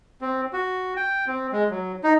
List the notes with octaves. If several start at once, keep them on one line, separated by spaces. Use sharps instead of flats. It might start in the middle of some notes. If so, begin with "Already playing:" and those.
C4
F#4
G5
C4
G#3
F#3
D#4